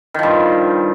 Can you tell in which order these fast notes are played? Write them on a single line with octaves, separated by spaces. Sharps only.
D#3 F3 G2